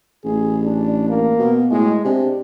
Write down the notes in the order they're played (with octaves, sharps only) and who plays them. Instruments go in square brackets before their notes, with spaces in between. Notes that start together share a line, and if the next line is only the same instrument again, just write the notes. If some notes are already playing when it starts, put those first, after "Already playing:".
[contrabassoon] A1 [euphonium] G#4
[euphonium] D4
A#3
[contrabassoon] B2
[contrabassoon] A2 [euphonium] G#3
[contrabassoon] C3 [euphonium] D4